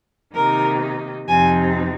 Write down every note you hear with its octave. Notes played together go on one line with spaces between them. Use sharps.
C3 D#3 A#3 D#4 A#4
F2 C3 F3 C4 D#4 G#5